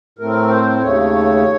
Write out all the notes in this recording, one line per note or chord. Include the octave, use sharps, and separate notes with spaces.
A2 A3 C4 A#4
C5
D#2 C#3 A3 C#5